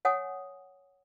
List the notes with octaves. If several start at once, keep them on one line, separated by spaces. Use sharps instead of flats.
C#5 F#5 G#5 D#6